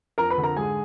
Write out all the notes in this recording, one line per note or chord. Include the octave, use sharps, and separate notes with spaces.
F2 A#4 A#5
B4 B5
D3
A#4 A#5
G#2 G#4 G#5